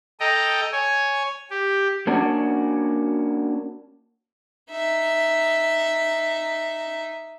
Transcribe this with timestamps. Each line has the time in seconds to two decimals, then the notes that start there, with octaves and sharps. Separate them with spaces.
0.20 A4 D#5 G5 A#5
0.72 C#5 G#5
1.51 G4
2.07 A#3 C#4 D4 F#4
4.71 D#4 E5